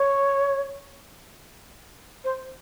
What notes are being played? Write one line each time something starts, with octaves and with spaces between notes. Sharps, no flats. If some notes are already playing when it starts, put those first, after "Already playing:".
Already playing: C#5
C5